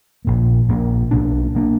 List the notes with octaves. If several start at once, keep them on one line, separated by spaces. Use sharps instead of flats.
A#1 A#2 A#3
A#1 A#2 A#3
B1 B2 A#3 D4
B2 A#3 D4